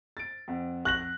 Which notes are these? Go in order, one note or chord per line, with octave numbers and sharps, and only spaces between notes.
A6 D7
F2 F#5
F#6 A#6 F#7